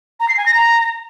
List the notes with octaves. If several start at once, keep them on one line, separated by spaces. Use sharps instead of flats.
A#5
C7
G#5
A#6
A#5